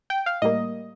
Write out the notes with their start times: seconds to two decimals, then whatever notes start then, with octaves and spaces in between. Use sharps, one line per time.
0.10 G5
0.26 F5
0.42 A2 G3 A#3 D#5